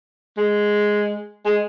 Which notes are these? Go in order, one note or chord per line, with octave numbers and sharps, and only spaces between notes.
G#3
G#3